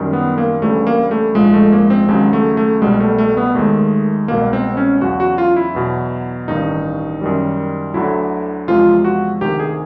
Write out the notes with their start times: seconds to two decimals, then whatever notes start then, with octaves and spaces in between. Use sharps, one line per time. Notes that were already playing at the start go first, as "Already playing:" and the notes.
Already playing: F#2 D#3 G3
0.13 B3
0.38 A#3
0.62 D2 C#3 E3 G3 A3
0.87 A#3
1.11 A3
1.35 A#1 G#2 F3 G#3
1.53 A3
1.72 A#3
1.90 C4
2.08 D#2 C#3 F#3 G#3
2.33 A3
2.57 A3
2.82 C2 B2 G3 G#3
3.00 A3
3.18 A3
3.37 B3
3.55 D#2 D#3 G#3 A3
4.28 C2 B2 G#3 A#3
4.53 C4
4.77 C#4
5.01 E2 C#3 F#3 F#4
5.20 F#4
5.38 F4
5.56 E4
5.75 E2 B2 F#3
6.48 A1 G2 D#3 D#4
7.21 F#2 D#3 G3
7.94 D2 D3 F#3 E4
8.68 E2 C3 F3 G#3 F4
9.04 F#4
9.41 D2 C3 D#3 G4
9.59 G#4